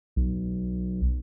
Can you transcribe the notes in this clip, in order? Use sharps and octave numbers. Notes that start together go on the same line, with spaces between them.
B1